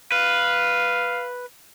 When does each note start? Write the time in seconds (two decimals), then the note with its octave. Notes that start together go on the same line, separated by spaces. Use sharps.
0.12 B4 F5